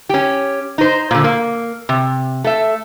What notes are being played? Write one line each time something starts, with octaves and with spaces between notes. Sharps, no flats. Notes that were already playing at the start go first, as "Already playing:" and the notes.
C#4 G4
D#4 C5
A#2 D3
A#3
C3
A3 E5